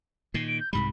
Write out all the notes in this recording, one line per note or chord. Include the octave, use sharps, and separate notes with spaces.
A#2 D#3 C7
D7
G6
C2 G#2 G3 B5